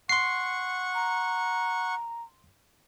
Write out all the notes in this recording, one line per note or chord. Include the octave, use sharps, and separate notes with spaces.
F#5 C6 C#6 C7
A#5